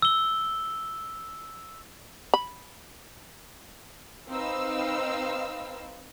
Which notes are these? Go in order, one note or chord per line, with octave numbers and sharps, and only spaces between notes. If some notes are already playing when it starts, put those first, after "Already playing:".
E6 G7
B5
C4 D#4 B4 F5 E6